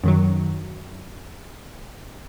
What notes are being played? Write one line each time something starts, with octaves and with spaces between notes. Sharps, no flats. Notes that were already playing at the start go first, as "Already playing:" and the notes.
F#2 D#3 F#3